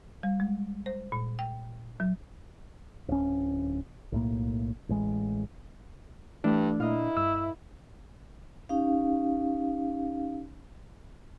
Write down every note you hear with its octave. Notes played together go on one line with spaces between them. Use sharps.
G3
G#3
C5
A#2
G5
F#3
D1 C#4
B1 A2 A#3
A1 G#3
G2 E3 A3 D4
A#2 E4 A#4 D#5 F5
G2 E6
C#4 D#4 G4 F5